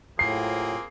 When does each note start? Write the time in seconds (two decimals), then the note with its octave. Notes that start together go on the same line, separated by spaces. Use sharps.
0.19 A2 C3 F#3 A#3 C4 F4 G#4 C7